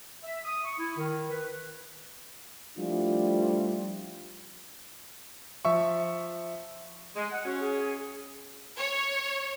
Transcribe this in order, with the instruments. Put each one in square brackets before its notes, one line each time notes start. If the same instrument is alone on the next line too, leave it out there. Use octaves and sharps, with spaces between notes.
[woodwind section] E5
D#6
C#6
E4
D#3
B4
[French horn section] F3 G3 A3 D4 E4 F4
[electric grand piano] F3 E5 C#6
[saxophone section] G#3
F#5
[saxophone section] C#4 [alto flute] F#4
[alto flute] G#4
[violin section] C#5